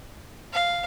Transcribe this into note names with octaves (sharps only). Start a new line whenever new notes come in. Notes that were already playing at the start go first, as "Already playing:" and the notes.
F5